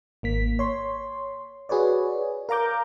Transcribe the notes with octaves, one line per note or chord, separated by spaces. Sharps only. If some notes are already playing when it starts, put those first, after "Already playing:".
G#1 A#3 B6
C#5 C6
F#4 G#4 B4 C#5 D5
A#4 F5 A#5 D6 G6